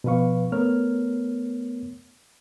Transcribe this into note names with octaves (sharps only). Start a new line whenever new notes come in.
B2 F3 B4 F5 C#6
A3 B3 A#4 C#5 F6